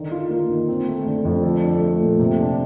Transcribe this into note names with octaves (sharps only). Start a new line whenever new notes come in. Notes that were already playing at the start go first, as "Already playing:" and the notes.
Already playing: D3 D#3
F4
A#3
D#3
C4
A3
D3
F2
A4
D4
A3
A#2
C3
D4